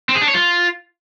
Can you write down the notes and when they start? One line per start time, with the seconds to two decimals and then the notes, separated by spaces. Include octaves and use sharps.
0.09 C4
0.15 G#4
0.22 D4
0.28 C#5
0.34 F4